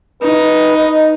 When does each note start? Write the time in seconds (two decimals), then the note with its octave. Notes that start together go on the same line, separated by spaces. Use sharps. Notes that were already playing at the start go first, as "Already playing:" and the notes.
0.22 D#4 B4
0.77 D#5